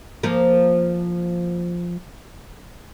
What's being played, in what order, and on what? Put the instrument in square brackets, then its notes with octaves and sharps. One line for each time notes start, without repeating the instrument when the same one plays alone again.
[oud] F3 A#3